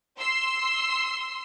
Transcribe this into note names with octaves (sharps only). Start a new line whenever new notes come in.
C6 E6 C7